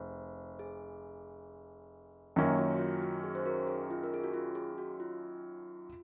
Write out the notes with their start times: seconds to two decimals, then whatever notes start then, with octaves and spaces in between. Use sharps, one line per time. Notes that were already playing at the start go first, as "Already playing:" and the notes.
Already playing: F1 G#4 C5
0.59 G#4
2.36 F#2 D#3 A#3 C#4 F4
2.58 F#4
2.75 F#4
2.79 F4
3.02 F#4
3.24 G#4
3.35 C5
3.46 F#4 A#4
3.67 G#4
3.90 F4
4.03 A#4
4.14 G#4
4.24 F#4
4.34 F4
4.55 G#4
4.78 F#4
5.00 F4